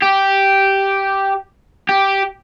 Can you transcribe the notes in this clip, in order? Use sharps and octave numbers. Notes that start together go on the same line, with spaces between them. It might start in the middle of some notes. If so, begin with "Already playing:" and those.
G4
G4